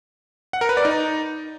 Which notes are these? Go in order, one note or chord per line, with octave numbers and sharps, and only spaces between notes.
F#5
A#4
B4
D5
D#4